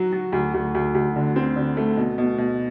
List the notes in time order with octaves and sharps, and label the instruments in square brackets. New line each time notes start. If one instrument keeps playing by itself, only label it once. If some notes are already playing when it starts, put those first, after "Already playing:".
Already playing: [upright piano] F#3 F#4
F#3
D2
D2
D2
D2
D3
C4
D3
A3
B2
B2
B2